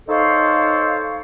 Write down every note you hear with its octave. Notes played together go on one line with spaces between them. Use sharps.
D#4 A4 C5 C#5 F5